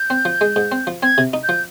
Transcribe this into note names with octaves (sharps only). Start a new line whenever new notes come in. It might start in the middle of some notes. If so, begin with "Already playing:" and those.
Already playing: G6
C4
F3
G#3
G#2
C4
F3
C4 G#6
C3
D#4
G6
F3